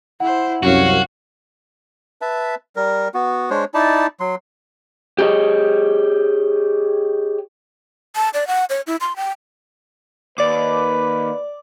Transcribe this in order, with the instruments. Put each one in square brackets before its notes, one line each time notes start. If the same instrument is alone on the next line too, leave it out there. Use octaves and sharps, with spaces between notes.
[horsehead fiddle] E4 C5 [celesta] F#5
[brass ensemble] C2 F#2 [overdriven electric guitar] F#4 [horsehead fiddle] C#5 F5
[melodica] B4 E5 A5
G3 A#4
B3 F#4
G#3 D4 C5 C#5
D#4 E4 D5 A5
F#3 C6
[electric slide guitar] G4 G#4 C#5 D#5
[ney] A5
D5
F#5
C#5
E4
C6
G5
[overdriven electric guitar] D#2 [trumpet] B4 [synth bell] D5 D6